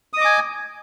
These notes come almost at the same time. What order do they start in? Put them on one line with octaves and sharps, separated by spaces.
D#6 D#5 D6 G#5